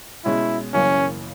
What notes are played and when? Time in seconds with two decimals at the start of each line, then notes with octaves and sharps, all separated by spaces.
0.25 B2 G#3 C#4 E4
0.73 F#1 F#2 C#3 E3 A#3 C#4